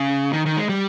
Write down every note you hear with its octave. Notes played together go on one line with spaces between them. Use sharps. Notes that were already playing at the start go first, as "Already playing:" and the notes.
Already playing: C#3
D#3
D#3
G#3
G3